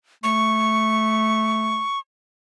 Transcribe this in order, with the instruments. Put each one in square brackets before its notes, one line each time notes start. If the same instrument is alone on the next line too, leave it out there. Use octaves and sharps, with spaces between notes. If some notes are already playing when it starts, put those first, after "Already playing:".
[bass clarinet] A3 [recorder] C#6